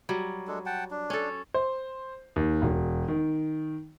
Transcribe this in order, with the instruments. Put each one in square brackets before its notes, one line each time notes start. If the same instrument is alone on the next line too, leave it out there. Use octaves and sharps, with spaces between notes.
[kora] F#3 G3
[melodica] G#3 D4 A4
F#5 G5 A5
D4
[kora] C#4 A4
[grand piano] C5
D#2
E1
D#3